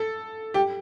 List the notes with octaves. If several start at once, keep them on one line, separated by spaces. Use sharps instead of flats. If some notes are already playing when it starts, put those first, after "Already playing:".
Already playing: A4
G4